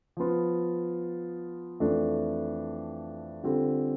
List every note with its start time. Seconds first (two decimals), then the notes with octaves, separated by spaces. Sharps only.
0.17 F3 B3 F4
1.80 F2 E3 A3 D4 A4
3.43 D3 G3 C4 F4 A4